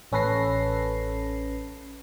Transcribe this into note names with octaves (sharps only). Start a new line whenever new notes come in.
A1 C#4 A4 B4 A#6 C7